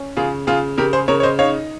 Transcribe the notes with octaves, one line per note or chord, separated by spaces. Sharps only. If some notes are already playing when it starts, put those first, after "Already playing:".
Already playing: C#4
C#3 F4 G#4
C#3 F4 G#4
C#3 G4 A#4
G#4 C5
C#3 A#4 C#5
C#5
C5 D#5
D#4 C#5 F5